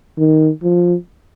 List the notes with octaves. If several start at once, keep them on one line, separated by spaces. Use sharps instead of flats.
D#3
F3